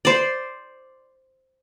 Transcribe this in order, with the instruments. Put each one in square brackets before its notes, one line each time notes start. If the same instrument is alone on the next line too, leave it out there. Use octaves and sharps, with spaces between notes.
[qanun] C5 D5